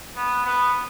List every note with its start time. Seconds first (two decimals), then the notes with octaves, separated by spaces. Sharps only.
0.16 B3
0.45 B3